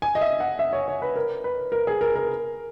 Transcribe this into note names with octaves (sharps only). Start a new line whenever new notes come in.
G#5
D#5
E5
F#5
E5
C#5
C#5
B4
A#4
B4
A#4
G#4
A#4
A#4